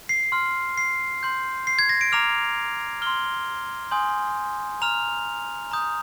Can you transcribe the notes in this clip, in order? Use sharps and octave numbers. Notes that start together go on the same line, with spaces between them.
C7
C6 F6
C7
C6 G6
C7
G#6
A#6
D7
A#5 D6 F6 F7
C6 F6 G7
G#5 C6 D#6 G6
A#5 F6 F7
A#5 D#6 G6